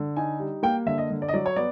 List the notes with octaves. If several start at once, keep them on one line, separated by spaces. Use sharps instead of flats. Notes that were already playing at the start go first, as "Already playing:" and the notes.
Already playing: D3
D#4 G#5
G3
A#3 G5
D3 E5
D#5
D3
D5
D#5
F#3 D5
C#5
B3 D5